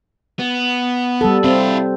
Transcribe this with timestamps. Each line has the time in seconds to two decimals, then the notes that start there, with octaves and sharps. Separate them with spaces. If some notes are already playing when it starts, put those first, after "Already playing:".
0.39 B3
1.21 G3 A4
1.44 C4 E4 F5